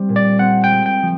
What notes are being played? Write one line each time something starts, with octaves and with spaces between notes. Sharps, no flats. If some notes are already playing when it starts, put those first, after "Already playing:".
Already playing: G3 C4
A#2
D5
C4 F#5
G5
G#3
G5
F3